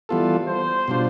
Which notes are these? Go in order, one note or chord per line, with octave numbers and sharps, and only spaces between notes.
E3 G3 B3 F4 A4
C5
B2 G3 D4 F4